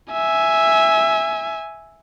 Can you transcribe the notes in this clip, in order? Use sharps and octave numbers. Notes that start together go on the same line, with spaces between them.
E5 G#5